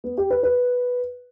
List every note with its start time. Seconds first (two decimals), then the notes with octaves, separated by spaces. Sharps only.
0.04 B3
0.18 G4
0.30 B4
0.43 B4